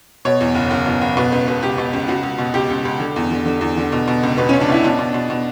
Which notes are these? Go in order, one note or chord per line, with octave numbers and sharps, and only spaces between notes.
B2 C#5
E2
F#1
F#1
B2
F#1
B2 B4
C#2 B4
B2 B4
C#2 G4
B2
C#2
C#2 F#4
C#2
B2
C#2 G4
C#2
C#2
D3
E2
D3
D3
E2
D3
B2
B2
C#2
B2 B4
C#2 C#4
D4
B2 E4
B2 D4
B2
B2
B2